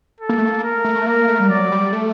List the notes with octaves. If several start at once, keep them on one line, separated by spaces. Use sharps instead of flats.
A4
A#3
A3
A#3
A#4
A3
A#3 A#4
A3
G3
F#3 D5
G3
A3